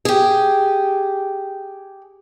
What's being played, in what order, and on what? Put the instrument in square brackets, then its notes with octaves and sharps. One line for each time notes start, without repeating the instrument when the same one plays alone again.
[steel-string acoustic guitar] G4 G#4